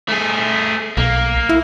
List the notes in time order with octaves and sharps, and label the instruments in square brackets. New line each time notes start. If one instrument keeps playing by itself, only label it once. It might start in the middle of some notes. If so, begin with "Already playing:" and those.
[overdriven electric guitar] A3 G#4
[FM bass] B1 [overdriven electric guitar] A#3
[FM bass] E4